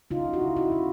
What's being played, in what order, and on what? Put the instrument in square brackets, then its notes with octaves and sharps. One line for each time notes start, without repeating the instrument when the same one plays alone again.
[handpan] C#3 D#4 F4
E4 F#4
C#3
E4 F#4
C#3